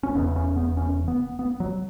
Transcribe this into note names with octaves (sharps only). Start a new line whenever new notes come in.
C#4
E1 E2 C#3 B3
C#4
B3
C#4
B3
B3
F#3